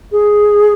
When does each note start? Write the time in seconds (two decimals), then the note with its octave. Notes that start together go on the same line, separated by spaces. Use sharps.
0.12 G#4